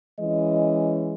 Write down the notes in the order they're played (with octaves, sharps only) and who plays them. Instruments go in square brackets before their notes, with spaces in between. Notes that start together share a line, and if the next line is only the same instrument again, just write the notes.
[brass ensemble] E3 G#3 C#4 D#5